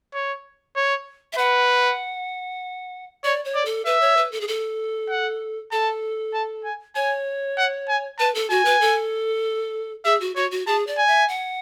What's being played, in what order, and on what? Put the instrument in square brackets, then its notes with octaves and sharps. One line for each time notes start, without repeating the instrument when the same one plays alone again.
[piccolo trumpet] C#5
C#5
[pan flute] E5
[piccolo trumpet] B4 [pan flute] F#5
[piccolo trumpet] C#5 [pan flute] D5
[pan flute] C#5
[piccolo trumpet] D5
[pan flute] A4
[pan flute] B4 [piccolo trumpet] E5
[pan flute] C#5
B4
A4
G#4
A4
[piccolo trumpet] F#5
[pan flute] A4 [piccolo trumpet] A5
[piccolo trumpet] A5
G#5
[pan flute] C#5 [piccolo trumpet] G#5
[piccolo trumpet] F#5
G#5
[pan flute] B4 [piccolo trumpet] A5
[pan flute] A4
[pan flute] F#4 [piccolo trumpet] G#5
[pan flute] B4
A4
[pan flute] G#4 [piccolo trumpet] E5
[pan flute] F#4
[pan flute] F#4 [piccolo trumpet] C#5
[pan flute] F#4
[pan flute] G#4 [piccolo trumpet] A5
[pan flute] D5
[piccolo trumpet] G#5
[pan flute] E5
F#5